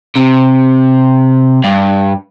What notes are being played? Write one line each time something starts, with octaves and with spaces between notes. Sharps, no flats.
C3
G2